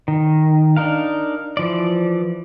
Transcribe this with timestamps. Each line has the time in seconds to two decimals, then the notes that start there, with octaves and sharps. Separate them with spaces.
0.08 D#3
0.77 D4 D#4 A#4 F5
1.57 E3 F3 D5